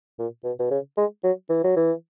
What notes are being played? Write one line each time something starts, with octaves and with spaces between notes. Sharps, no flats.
A#2
B2
B2
C#3
G#3
F#3
E3
F#3
E3